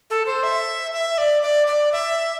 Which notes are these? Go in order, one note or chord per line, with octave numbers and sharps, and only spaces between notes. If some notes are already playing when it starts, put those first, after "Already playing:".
A4
C5
E5
E5
D5
D5
D5
E5